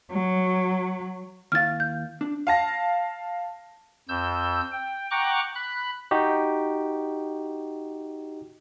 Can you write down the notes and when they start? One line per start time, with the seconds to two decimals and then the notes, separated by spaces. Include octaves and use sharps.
0.10 F#3
1.52 D#2 E4 F5 F6 A6
1.80 G6
2.21 D4
2.47 F5 A5 A#6
4.08 F2 E6 G6
4.72 G5
5.11 F#5 G5 A#5 C#6 D6 F#6
5.55 B5 F#6
6.11 D#4 F#4 G4